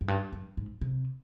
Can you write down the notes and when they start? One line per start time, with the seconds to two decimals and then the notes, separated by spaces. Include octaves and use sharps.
0.01 F#2
0.08 G2
0.33 F#2
0.57 G#2
0.81 C3